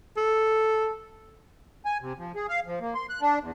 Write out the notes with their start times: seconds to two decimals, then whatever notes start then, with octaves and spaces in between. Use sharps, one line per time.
0.17 A4
1.85 G#5
2.01 C3
2.18 F3
2.36 G#4
2.49 F5
2.66 F3
2.80 A#3
2.95 C6
3.09 F#6
3.21 D4
3.40 E2